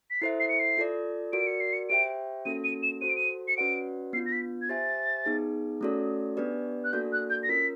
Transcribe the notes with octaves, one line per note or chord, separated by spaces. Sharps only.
B6
E4 A4 C5 E5 C7
C7
C#7
C7
F4 A4 D5
F#4 A#4 D5 D7
C#7
C7
C#7
G4 C5 E5 G5 D7
A#3 C#4 F#4 A4 D#7
D#7
E7
F#4 A4 C5 D#7
D7
D#7
C#7
C#4 F#4 B4 D5 F#5 D7
B3 D4 F4 C7
A#6
B6
G#6
G4 C5 E5 G#5 A6
B3 D#4 G#4
A3 C#4 F#4 A4 D5
B3 D4 G4 B4 D5
F#6
A#3 D4 F#4 A4 D5 G6
F#6
G6
A#6
C#4 F4 A#4 B6